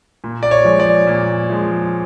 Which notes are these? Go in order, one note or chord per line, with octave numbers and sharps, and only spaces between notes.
A#2
D5
C#5
F3 G#3
D5
A#2
F3 G#3